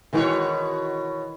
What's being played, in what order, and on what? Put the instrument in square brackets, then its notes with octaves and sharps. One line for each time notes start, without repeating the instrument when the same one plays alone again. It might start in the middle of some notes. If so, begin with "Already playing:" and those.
[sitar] B2 F#4 C#5 [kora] D#3 E3 G#3